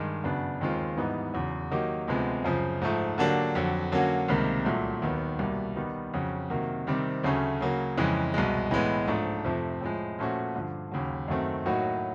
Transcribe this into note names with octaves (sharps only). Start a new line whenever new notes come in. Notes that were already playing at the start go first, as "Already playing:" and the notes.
Already playing: G2 D#3 G#3
F#2 C#3 F#3 B3 D4
D#2 D#3 G#3 C4 F4
G#2 E3 G3 B3 D#4
E2 C#3 F#3
D#3 F#3 A#3 D#4 G4
D2 C3 F3 G#3 B3
F#2 C#3 F3
G#2 F3 A3
D3 F#3 A#3 D4 G4
F2 D3 F#3
D3 F#3 A#3 C#4 F#4
C#2 C3 D#3 G3 A#3
C2 A#2 F#3 A3
D#2 D#3 F#3 B3
C2 B2 G3 A#3
D#3 G3 B3 D#4
F2 C#3 F#3
C3 D#3 F#3 A#3
C3 D#3 G3 C4
D2 C#3 F#3 A3 C#4
C#3 F#3 A#3
F2 C#3 E3 G#3
C2 B2 G#3
A2 E3 G#3 B3
G#2 F3 A3 D4
F2 C3 F3 A3
A2 F3 G#3
A#2 F3 A3 C#4 F#4
G2 D3 F3
D#2 C#3 F#3
F#2 D#3 F#3 A3 C4
A2 F#3 A#3 D#4 F#4